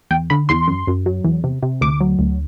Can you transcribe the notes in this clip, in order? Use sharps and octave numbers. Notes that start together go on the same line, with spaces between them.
E2 G5
D3 B5
E2 C6
F#2
F#2
F#3
E2
C3
C3
D2 D6
F#3
D2